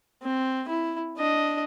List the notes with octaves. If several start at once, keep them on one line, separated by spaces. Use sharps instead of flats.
C4
E4
D4 D#5